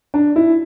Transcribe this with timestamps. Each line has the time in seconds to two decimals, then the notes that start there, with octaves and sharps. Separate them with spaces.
0.14 D4
0.36 E4